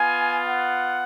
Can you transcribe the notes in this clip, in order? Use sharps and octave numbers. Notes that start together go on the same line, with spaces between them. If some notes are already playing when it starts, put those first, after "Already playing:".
Already playing: B3 F4 G#5
F#5